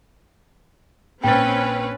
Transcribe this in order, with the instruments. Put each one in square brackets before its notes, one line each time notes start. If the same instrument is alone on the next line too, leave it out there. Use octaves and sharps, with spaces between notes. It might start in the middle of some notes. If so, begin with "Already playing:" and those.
[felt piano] A#1 A6 [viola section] C4 C#4 B4 [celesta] G5